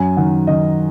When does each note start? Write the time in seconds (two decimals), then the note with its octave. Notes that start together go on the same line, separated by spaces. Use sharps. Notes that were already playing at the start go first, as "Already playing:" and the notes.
Already playing: F#2 G#5
0.17 D#3 F#5
0.47 D#3 D#5